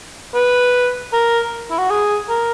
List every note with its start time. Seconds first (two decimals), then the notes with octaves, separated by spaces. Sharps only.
0.35 B4
1.13 A#4
1.71 E4
1.78 F#4
1.90 G#4
2.29 A#4